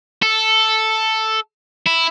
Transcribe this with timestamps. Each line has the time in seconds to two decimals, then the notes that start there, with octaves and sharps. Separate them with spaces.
0.23 A4
1.87 E4